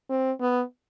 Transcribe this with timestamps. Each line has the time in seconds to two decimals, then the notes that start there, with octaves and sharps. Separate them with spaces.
0.10 C4
0.41 B3